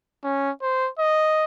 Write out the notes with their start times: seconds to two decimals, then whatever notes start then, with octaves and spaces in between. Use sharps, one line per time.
0.24 C#4
0.62 C5
0.99 D#5